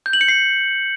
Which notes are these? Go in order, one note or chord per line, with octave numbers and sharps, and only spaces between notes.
G6
F#7
C#7
C7